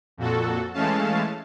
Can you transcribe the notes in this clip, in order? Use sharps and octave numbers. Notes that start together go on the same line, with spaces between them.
F2 A#2 F#4 A4
E3 G#3 A3 C#4 F5 A5